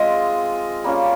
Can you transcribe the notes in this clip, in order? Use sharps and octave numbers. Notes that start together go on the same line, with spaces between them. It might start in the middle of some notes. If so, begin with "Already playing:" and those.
Already playing: G#3 C4 F4 D#5
G3 A#3 C#4 F4